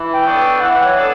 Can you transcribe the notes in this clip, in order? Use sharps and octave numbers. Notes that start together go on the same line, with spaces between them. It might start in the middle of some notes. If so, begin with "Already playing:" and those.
Already playing: E3
G5
B3 D4 A4 C#5
G5
E3 F#5
C#5
B3 D4 A4